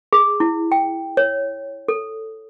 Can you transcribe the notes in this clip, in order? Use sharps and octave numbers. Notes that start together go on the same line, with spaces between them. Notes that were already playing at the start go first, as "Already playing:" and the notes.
G#4
E4
G5
C#5
A4